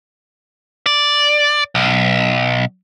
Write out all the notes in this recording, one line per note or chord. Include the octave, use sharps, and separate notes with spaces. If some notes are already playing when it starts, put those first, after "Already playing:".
D5
B1